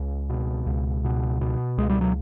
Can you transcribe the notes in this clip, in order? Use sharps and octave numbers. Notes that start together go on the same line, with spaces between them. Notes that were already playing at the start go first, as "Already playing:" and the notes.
Already playing: C#2
B2
C#2
B2
B2
C#2 G#3
G3
F#3